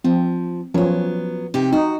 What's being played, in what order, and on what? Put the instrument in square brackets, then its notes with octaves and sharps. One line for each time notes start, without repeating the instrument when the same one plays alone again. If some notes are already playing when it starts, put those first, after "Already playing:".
[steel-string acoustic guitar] F3 [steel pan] C4
[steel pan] F3 C#4 [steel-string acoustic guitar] F#3 B3
[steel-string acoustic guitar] C3 D#4 G4
[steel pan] D#4 [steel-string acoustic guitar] F#4